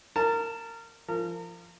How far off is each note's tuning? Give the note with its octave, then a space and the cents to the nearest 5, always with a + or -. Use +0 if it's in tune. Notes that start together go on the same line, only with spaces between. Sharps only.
A#4 -25 A5 +0
F3 -20 A#4 -35